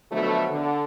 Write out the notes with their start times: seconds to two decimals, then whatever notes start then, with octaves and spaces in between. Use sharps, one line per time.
0.11 B2 D3 F3 F#3 A3
0.50 D3